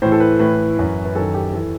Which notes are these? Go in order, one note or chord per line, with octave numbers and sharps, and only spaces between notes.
A2 E3 C5
A4
B4
A2 E3 B4
F#2 E3
B4
F#2 D#3 A4
G4
E3 A4